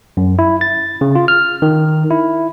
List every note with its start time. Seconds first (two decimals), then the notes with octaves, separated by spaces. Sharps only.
0.17 F#2
0.39 E4
0.61 A6
1.01 C#3
1.15 F4
1.28 F6
1.62 D#3
2.10 E4